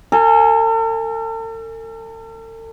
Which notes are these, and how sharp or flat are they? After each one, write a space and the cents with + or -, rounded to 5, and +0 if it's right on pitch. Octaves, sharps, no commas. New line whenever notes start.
A4 +45 G#5 +0